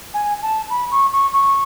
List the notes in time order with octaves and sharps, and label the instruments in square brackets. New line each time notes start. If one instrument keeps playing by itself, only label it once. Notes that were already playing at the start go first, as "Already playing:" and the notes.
[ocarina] G#5
A5
B5
C#6
C#6
C#6